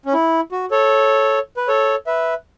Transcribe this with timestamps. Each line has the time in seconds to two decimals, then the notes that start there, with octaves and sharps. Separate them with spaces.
0.06 C#4
0.13 E4
0.52 F#4
0.71 A4 C#5
1.57 B4
1.68 A4 C#5
2.07 B4 E5